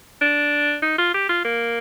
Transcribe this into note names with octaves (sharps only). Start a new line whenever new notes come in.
D4
D#4
F4
G4
F4
A#3